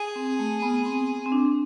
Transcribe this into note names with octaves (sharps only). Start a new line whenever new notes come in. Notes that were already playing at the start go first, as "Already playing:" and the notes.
Already playing: G#4
C4
A3
B3
C4
C4
D4